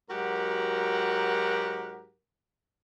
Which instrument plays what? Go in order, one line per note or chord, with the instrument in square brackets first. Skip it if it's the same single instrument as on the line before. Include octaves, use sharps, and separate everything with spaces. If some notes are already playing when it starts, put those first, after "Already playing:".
[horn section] G#2 F#3 F#4 G4 A#4 F#5